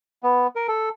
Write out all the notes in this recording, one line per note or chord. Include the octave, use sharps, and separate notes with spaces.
B3
A#4
A4